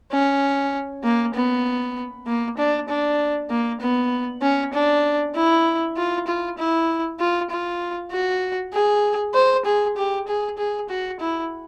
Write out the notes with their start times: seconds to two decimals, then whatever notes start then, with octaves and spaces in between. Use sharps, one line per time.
0.12 C#4
1.04 A#3
1.35 B3
2.27 A#3
2.58 D4
2.89 D4
3.50 A#3
3.81 B3
4.42 C#4
4.73 D4
5.35 E4
5.97 F4
6.27 F4
6.58 E4
7.20 F4
7.50 F4
8.11 F#4
8.73 G#4
9.35 C5
9.65 G#4
9.97 G4
10.28 G#4
10.58 G#4
10.89 F#4
11.20 E4